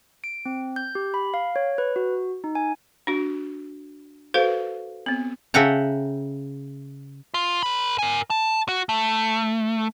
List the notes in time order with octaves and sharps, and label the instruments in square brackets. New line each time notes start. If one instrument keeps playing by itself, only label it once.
[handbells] D7
C4
G6
G4
B5
F5
C#5
B4
F#4
D#4
G#5
[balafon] D4 F#4
F#4 A4 B4 C5 F5
B3 C4
[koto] C#3 A4 E5 F#5 G5 A#5
[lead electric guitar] F4
A#4 B5
A#4 G#5
A5
F#4
A3